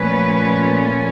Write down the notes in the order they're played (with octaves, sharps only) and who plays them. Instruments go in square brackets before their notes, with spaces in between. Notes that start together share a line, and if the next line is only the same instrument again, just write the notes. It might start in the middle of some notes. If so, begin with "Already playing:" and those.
Already playing: [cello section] A#2 F3 A3 C#4 B4